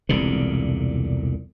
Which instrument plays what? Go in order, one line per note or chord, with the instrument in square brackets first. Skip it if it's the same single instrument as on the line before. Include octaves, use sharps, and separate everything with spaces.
[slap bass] E1 C2 A#2 D3